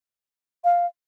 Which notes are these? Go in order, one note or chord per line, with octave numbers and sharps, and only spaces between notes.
F5